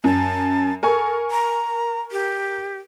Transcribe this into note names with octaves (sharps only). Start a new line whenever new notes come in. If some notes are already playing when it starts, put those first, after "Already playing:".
F#2 A5
A4 A#4 G#5 C#6
A#5
G4